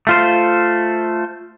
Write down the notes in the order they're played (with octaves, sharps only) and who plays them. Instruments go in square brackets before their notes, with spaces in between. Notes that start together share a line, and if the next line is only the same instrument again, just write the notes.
[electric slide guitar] A3 F4 C5